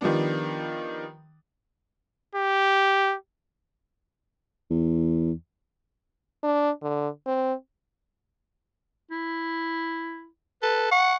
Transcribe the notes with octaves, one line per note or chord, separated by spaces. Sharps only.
D#3 F3 G3 B3 D4
G4
E2
D4
D3
C4
E4
A4 B4
F#5 C#6